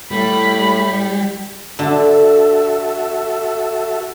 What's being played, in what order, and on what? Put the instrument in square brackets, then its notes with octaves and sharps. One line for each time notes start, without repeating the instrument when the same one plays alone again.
[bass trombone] A2 [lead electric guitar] G3 [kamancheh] B5
[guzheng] D3 A5 [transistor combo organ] F#4 A4 E5